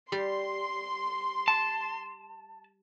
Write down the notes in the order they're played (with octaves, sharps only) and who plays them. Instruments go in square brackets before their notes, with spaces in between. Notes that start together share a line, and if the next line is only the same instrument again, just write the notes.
[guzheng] G3 [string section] C6
[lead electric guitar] A5